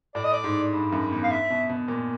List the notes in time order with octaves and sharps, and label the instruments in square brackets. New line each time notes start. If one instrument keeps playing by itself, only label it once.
[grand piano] A2 [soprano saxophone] D5
[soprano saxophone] D#5
D5
[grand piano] G#2
G2
F#2
E2
[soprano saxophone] F5
E5
[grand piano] B2
B2
A#2